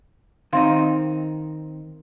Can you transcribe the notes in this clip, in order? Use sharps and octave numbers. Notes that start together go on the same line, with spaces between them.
D#3 C4 D#4 F5 C6